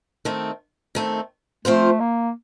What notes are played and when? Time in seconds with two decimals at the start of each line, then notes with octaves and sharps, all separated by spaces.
0.25 D#3 A3 C4
0.95 D#3 A3 C4
1.65 F3 A3 C4 F4 C5
2.00 A#3